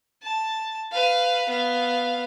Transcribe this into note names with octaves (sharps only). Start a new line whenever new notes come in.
A5
B4 F5
B3 F5